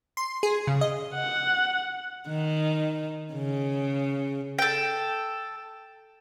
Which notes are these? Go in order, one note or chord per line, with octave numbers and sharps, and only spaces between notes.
C6
G#4
C#3
D#5
F#5
D#3
C#3
A4 G5